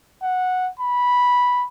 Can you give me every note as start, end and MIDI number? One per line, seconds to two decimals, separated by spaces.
0.23 0.69 78
0.80 1.67 83